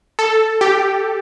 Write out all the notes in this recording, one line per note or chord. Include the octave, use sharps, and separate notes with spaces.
A4
G4